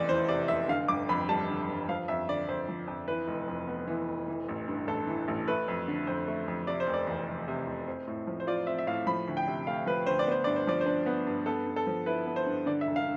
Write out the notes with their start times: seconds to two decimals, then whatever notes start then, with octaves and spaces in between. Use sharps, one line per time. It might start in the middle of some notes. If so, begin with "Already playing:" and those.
Already playing: F1 E2 C3 D5
0.09 E3 C5
0.29 C3 D5
0.48 F1 E5
0.68 D3 F5
0.88 G1 D6
1.09 F2 B5
1.28 G3 A5
1.49 D3
1.68 G1
1.89 F3 F5
2.08 F2 E5
2.28 D3 D5
2.48 F2 C5
2.68 F3
2.88 F2
3.08 E3 B4
3.28 F1
3.48 F2
3.67 B3
3.87 E3
4.08 F1
4.28 E3
4.48 A1
4.68 G2
4.87 A1 A4
5.07 E3
5.28 A1
5.48 A3 B4
5.68 F2
5.88 D3
6.07 F2 C5
6.28 A3
6.48 F2
6.67 C3 D5
6.80 C5
6.87 F1
6.93 D5
7.07 E2
7.28 F1
7.48 C3
7.67 F1
7.87 C4
8.07 A2
8.27 F3
8.40 C5
8.47 F4 D5
8.67 C4 E5
8.78 E5
8.87 A2 F5
9.07 F3 B5
9.28 D2
9.37 G5
9.48 C3
9.67 A3 F5
9.86 F3 B4
10.06 D2 C5
10.19 D5
10.27 B3 C5
10.44 G2 D5
10.56 C5
10.67 F3 D5
10.81 C5
10.86 D4
11.06 B3
11.27 G2
11.46 B3 A4
11.66 G2
11.76 A4
11.87 F3
12.06 E4 B4
12.26 B3
12.36 C5
12.46 G2
12.66 D3 D5
12.81 E5
12.87 E1
12.96 F5